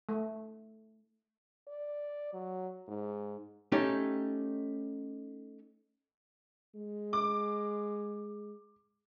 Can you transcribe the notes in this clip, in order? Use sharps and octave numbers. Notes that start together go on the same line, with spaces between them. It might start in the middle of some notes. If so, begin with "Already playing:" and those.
A3
D5
F#3
G#2
A3 C#4 D#4 G4
G#3
D6